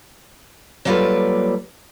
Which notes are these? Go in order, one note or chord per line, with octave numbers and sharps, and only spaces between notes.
F#3 G3 A#3 F4 A4 B4